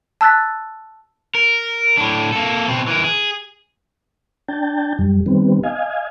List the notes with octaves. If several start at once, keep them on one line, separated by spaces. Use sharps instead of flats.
A5 E6 F#6 A6 B6
A#4
A2 D4
A#3 A4
B2 C4
E3 A#4
G#4
D4 G5 A5
F#2 G3
D#3 G3 B3 C4
D#5 F5 G#5